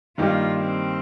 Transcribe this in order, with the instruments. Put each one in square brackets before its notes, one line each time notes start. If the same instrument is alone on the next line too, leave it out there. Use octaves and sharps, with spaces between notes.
[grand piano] G2 D#3 A#3 D#4 G4 [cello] F4
[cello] C4